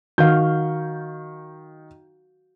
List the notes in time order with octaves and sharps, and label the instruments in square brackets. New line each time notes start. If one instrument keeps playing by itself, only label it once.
[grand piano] D#3 G6 [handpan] F#4 F5